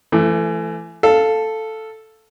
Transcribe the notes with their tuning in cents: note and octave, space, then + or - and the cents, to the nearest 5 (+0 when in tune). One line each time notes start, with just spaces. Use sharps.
E3 +30 A3 +0
A4 +0 F5 +0